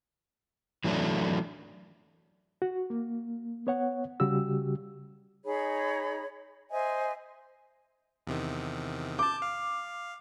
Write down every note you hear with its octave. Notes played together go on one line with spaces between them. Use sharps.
E3 F#3 A3 D4
F#4
A#3
B3 C#5 F#5
C#3 G3 F#4 G4 E6
D#4 G#4 C#5 B5
C5 D#5 E5 G#5
E2 C3 D#3
A5 D6 G6
F5